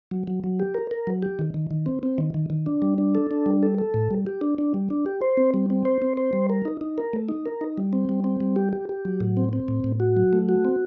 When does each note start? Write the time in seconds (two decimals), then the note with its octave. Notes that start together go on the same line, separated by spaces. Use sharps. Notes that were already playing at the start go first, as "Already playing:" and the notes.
0.11 F#3
0.27 F#3
0.44 F#3
0.60 G4
0.75 A#4
0.91 A#4
1.07 F#3
1.23 G4
1.39 D#3
1.54 D#3
1.71 D#3
1.86 C4
2.03 C4
2.18 D#3
2.34 D#3
2.50 D#3
2.66 D4
2.82 G3
2.98 D4
3.15 A4
3.31 D4
3.46 G3
3.63 A4
3.78 A4
3.94 A2
4.11 G3
4.27 G4
4.41 D4
4.58 D4
4.74 G3
4.90 D4
5.06 G4
5.21 C5
5.37 C4
5.54 G3
5.70 C4
5.85 C5
6.02 C4
6.17 C5
6.33 G3
6.50 A#4
6.65 D#4
6.81 D#4
6.98 A#4
7.13 A3
7.29 D#4
7.46 A#4
7.61 D#4
7.78 G3
7.93 C4
8.09 G3
8.24 C4
8.40 G3
8.56 G4
8.73 G4
8.89 G4
9.05 F#3
9.20 A2
9.37 C4
9.53 C4
9.68 A2
9.84 A2
10.00 F#4
10.17 F#3
10.33 A3
10.49 F#4
10.65 C4